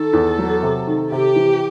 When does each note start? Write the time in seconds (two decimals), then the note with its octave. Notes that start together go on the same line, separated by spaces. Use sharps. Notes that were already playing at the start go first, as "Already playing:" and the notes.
Already playing: D#3 A4
0.13 E2
0.39 F#3
0.63 C3
0.87 D#3
1.12 C3 G4
1.35 E3